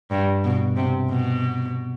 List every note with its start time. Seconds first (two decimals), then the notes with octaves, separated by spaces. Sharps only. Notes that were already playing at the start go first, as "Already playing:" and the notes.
0.11 G2
0.44 B2
0.77 C3
1.10 B2